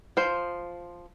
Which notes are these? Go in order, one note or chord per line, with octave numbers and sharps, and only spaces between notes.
F3 C5